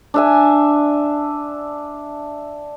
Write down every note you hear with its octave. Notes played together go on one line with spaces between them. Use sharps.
D4 E5 G#5